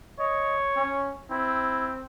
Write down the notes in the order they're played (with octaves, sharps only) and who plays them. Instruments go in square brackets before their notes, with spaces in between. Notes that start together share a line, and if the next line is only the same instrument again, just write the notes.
[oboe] C#5 [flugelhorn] D#5
[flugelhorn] C#4
[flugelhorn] C4 [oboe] E4